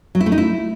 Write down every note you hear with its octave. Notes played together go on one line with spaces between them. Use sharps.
F#3
E4
A3
D#4
E4